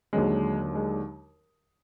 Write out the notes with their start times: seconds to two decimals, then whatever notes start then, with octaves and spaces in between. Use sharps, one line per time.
0.13 D#2 D3 F#3 G#3
0.75 G#3